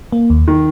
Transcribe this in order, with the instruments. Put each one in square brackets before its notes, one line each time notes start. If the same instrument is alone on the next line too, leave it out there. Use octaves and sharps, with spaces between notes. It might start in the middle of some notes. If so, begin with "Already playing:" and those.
[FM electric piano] A#3
D#2
[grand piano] D#3